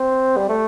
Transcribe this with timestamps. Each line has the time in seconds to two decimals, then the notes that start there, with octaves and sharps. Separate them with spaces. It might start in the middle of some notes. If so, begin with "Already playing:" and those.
Already playing: C4
0.37 G3
0.49 A3